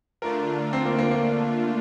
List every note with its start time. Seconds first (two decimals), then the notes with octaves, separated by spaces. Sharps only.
0.22 D3 A3 D4 F4 A#4
0.73 C4
0.86 A#3
0.99 A#3
1.11 A#3